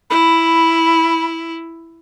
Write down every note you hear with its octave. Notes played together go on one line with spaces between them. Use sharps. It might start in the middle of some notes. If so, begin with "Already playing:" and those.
E4 B5